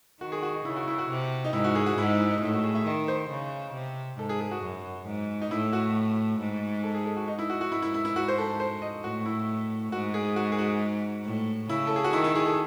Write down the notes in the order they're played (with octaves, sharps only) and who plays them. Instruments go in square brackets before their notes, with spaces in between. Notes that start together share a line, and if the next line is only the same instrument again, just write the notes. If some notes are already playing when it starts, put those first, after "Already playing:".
[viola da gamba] D#3 [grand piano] F#4
[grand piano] G#4
F#4
D#4
[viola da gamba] C#3 [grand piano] E4
[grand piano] F#4
E4
F#4
[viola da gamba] C3
[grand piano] D#4
[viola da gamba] G#2 [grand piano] E4
[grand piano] F#4
G#4
F#4
[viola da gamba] G#2 [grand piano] E4
[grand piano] D#4
E4
D#4
[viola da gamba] A2 [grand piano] E4
[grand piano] F#4
G#4
E5
[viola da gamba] D#3 [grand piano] D#5
[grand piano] C5
[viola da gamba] C#3
C3
[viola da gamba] G#2 [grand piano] A4
[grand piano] G#4
G#4
F#4
[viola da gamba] F#2
G#2
[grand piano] D#4
[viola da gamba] A2 [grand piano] E4
[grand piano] F#4
[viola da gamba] G#2
[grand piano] A4
G#4
A4
F#4
D#4
E4
F#4
F#4
[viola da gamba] G#2 [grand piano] E4
[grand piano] E4
E4
E4
F#4
C5
A4
C5
D#5
[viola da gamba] A2 [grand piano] F#4
[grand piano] E4
[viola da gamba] G#2 [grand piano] F#4
[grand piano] G#4
F#4
G#4
F#4
[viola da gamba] A2
[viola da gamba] C#3 [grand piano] E4
[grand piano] A4
G#4
F#4
[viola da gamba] D#3 [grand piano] E4
[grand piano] E4
G#4
A4